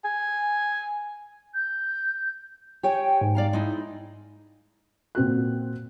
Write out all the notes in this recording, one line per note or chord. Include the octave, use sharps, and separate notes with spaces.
G#5
G6
G4 C#5 G5 G#5
G#2
D5 F5 A#5
G#3 D#4 E4
A#2 C4 F#4 F#6